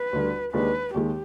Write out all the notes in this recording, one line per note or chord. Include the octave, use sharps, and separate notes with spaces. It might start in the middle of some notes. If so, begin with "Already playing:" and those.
Already playing: B4
D2 D3 G3
D#2 D#3 G#3 D4 G4 B4
D#2 D#3 G#3 G4